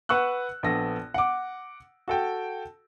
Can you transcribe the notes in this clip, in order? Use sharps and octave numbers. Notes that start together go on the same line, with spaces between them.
B4 F#5 C#6 E6 F#6
A#1 B3 A4 A#6
F#5 D6
F#4 A4 G5